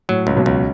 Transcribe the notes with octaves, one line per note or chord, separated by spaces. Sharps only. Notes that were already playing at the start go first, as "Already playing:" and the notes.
A2 F#3
C#2
B1 B2
C#2